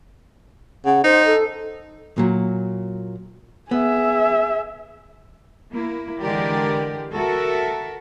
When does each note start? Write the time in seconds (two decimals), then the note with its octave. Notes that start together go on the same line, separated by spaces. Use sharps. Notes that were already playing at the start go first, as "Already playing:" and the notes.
0.85 C#3 F#5
1.04 D#4 C5
1.25 A4
2.18 A#2 F#3
3.71 B3 G#4 E5
5.71 A#3 E4
6.21 D3 E3 G#3 G4 A#4 D5
7.13 F#4 A4 A#4 E5